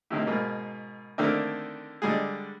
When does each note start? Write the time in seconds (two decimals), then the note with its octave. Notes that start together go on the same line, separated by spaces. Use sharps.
0.11 A2 C3 D#3 A#3
0.27 G#2 B2 A#3
1.18 D3 D#3 A3 A#3 C4 D4
2.02 D3 G3 G#3 G#4